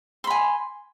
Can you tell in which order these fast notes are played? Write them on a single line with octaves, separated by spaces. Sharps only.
C6 B5 G#5